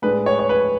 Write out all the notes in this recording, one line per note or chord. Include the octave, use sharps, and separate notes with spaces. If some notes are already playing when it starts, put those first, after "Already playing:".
A2 G#3 D4 B4
C#5
C#5
B4